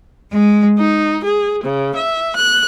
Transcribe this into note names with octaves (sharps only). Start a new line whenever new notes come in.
G#3
D#4
G#4
C#3
E5
F#6